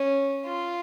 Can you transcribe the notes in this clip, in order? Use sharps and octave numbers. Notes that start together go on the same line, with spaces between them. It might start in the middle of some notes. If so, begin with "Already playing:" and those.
Already playing: C#4
F4